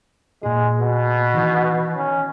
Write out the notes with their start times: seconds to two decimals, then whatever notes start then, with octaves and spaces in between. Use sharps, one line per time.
0.43 A#2 G#3 G#4
0.80 B2
1.33 D#3 E3
1.97 C#4